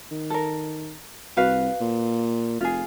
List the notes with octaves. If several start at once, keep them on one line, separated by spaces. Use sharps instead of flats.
D#3
A4 A#4
C2 F#4 B4 F5
A#2
F1 F4 G#4